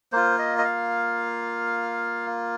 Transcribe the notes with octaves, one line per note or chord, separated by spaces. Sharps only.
A#3 F4 C5
D#5
D#5
F5